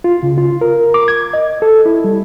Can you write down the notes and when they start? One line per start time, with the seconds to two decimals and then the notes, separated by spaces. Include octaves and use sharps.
0.04 F4
0.23 C#3
0.38 F4
0.61 A#4
0.94 D6
1.08 G#6
1.34 D#5
1.62 A4
1.86 E4
2.04 G3